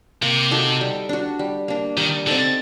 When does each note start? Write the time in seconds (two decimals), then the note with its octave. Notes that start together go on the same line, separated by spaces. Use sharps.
0.22 C3 A#3
0.51 D#4 F#4 A4
0.81 G3
1.09 D4 F#4
1.39 G3
1.68 A#3 D4
1.97 D#3 G3
2.27 D3 C4 D#4 A4